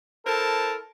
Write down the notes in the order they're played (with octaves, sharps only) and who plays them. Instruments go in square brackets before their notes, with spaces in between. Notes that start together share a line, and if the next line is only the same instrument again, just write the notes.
[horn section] E4 A4 A#4 C5 A5